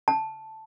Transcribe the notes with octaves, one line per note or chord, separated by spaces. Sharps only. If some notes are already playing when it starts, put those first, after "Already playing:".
A5